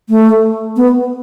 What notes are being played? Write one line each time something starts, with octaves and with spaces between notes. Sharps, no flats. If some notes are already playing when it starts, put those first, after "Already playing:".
A3
B3